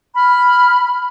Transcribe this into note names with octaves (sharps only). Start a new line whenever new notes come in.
B5 F6